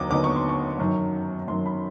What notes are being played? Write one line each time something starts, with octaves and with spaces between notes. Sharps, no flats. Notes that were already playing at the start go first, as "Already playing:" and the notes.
Already playing: D#2 D3 F#3 B3 D#4 D6 D#6
D#2 D3 F#3 B3 D#4 D6
C#6
C6
C#6
F#2 D#3 F#3
F#2 D#3 F#3 C6
B5